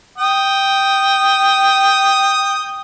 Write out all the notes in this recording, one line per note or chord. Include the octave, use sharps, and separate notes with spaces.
G5 D#6